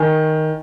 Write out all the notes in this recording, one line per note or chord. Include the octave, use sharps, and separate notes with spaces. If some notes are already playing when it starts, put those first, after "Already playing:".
Already playing: D#3 G#5